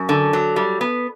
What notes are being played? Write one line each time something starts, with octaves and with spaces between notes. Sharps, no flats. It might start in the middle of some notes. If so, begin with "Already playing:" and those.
Already playing: F#2
D3
F#3
G3
B3